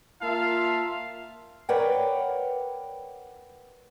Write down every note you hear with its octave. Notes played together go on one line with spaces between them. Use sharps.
A#3 F4 A#4 E5 F5 A5
A#4 B4 C#5 D5 F#5 G5